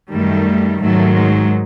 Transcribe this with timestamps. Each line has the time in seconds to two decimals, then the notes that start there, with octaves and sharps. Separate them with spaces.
0.13 F#2 D#3 G3 A3
0.81 G#2 D#3 F#3 A3
1.15 G#3